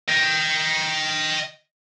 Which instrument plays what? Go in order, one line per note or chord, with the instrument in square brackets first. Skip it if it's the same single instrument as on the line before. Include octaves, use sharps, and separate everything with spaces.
[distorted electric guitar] D#5 G5